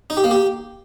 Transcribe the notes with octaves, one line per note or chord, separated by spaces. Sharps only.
D#4
G4
A#3
G4